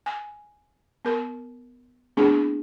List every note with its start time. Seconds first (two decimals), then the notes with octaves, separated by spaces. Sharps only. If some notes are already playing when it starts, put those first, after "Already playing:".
0.06 G#5
1.05 B3 A#4
2.17 A3 B3 C4 D4 E4 G#4